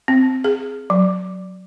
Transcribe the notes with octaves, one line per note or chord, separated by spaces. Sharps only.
C4
G#4
F#3